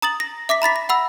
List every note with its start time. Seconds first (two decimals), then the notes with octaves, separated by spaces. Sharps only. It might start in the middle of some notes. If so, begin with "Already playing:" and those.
0.02 A#5 D#6 A6 F#7
0.20 A#6
0.49 E5 D6 A#6 B6
0.62 A#5 B5 A6 B6
0.76 A#6
0.89 F#5 B5 E6